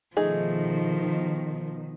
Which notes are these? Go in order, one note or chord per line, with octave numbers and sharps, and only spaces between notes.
B2 D#3 F3 A3 D#4 G#4